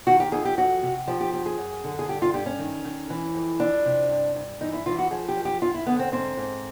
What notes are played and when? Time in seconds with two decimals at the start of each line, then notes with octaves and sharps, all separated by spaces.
0.07 D#3 F#4
0.20 G4
0.32 F2 G#4
0.45 G4
0.57 F2 F#4
0.82 C3
1.08 F3 G4
1.21 G4
1.33 F#2 G4
1.46 G#4
1.58 F#2
1.84 D3
1.99 G#4
2.09 G2 G4
2.22 F4
2.34 G2 G4
2.46 C#4
2.59 D#3
2.85 D#3
3.10 E3
3.35 F2
3.60 F2 D4
3.85 C3
4.10 G2
4.36 G2
4.61 E3 D#4
4.73 E4
4.86 E3 F4
4.99 F#4
5.11 F3 G#4
5.29 G4
5.37 F#2
5.45 G4
5.62 F#2 F4
5.74 E4
5.86 D3 B3
5.99 C4
6.12 G#2 C4
6.37 G#2